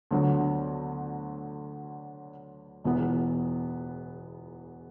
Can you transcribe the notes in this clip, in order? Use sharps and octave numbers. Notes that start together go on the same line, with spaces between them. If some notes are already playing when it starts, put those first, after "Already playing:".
D2 D3 F#3 B3
E1 E2 E3 B3